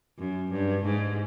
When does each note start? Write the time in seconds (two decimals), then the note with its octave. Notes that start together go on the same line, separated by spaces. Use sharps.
0.19 F#2
0.52 G2
0.85 G#2